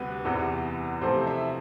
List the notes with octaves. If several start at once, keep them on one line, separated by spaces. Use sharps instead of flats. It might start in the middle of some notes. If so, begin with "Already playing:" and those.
Already playing: D2 C3 G3 B3 B4
E2 C3 E3 B3
C3 F3 A3 C4 E4 C5
E4 E5